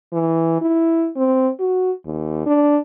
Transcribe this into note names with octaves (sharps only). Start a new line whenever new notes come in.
E3
E4
C4
F#4
D#2
D4